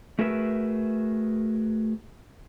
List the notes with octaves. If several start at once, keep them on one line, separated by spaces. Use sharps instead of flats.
A3 F#4 G#4 A#4 B4 E5